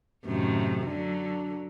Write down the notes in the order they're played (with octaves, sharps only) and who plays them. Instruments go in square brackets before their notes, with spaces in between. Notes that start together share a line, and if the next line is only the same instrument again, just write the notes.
[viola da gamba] F#2 A2 D#3 [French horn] C3
[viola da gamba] D3 F#3 [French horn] D4